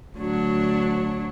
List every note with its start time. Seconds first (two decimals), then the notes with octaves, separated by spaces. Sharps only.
0.15 D2 F#3 D4